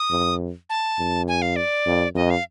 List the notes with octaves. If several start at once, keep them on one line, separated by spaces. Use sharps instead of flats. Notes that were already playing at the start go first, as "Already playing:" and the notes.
Already playing: D#6
F2
A5
F2
G#5
F5
D5
F2
F2 D#5
F5